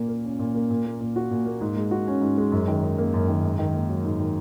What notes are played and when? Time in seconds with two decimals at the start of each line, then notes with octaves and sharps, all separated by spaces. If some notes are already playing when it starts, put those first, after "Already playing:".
Already playing: A#2 A#3
0.09 A#4
0.24 C#4
0.39 A#2
0.55 A#3
0.71 A#2
0.86 A#3
1.01 A#2
1.16 F#4
1.31 A#2
1.46 A#3
1.61 G#2
1.77 G#3
1.91 F#4
2.08 C#4
2.22 G#2
2.38 G#3
2.52 F#2
2.68 D#3
2.83 D#4
2.98 A#3
3.14 F#2
3.28 D#3
3.44 G#2
3.59 D#3
3.74 A#3
3.89 F#3
4.04 G#2
4.20 D#3